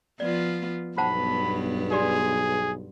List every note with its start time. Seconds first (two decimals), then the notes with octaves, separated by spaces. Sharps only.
0.20 F3 B3 F4 D5
0.98 B1 G2 B3 C5 F#5 A5 B5
1.92 G4 G#4 D5 C6